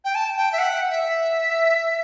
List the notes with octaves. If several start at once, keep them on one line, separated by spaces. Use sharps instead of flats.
G5
A5
G5
E5
F#5
E5